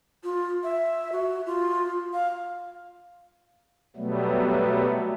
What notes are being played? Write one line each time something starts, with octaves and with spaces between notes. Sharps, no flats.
F4
E5
F#4
F4
F5
B2 F#3 G3 A3 B3